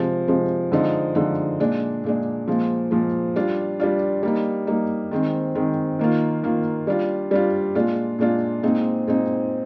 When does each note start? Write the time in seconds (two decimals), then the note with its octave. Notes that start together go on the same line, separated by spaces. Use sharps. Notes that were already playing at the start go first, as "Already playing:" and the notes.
Already playing: C3 F3 G#3
0.28 C3 F3 G#3
0.72 D3 F3 G#3 D#4
1.15 D3 F3 G#3 D#4
1.60 A#2 G#3 D4
2.04 A#2 G#3 D4
2.48 A#2 F3 G#3
2.91 A#2 F3 G#3
3.36 G3 D4 F4
3.80 G3 D4 F4
4.23 G3 A#3 D#4
4.67 G3 A#3 D#4
5.11 D#3 G#3 C4
5.55 D#3 G#3 C4
5.99 D#3 A#3 F4
6.43 D#3 A#3 F4
6.87 G3 D4 F4
7.31 G3 D4 F4
7.75 A#2 G#3 D4 F4
8.19 A#2 G#3 D4 F4
8.63 A#2 G#3 C4 D#4
9.07 A#2 G#3 C4 D#4